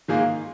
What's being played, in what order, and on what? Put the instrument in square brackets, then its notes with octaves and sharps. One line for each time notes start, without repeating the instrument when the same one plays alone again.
[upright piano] G#2 D#3 A#3 F4 G#4